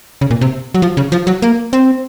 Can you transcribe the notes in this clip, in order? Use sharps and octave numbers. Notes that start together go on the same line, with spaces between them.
C#3
A#2
C3
F#3
F3
C#3
F3
F#3
A#3
C4